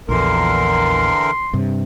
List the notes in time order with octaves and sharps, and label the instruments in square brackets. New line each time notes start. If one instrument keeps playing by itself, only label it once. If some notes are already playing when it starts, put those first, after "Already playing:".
[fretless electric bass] A#1 E2 [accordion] D3 E3 A#4 [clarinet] C6
[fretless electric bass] G2 C3